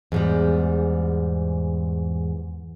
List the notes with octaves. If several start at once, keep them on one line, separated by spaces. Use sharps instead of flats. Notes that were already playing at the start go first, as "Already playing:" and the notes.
E2 G#2 G3